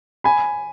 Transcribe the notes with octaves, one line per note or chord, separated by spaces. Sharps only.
G#5 B5